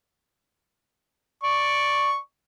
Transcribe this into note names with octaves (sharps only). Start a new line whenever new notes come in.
D5 C#6